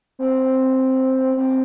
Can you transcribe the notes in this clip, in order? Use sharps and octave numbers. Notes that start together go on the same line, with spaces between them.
C4
C4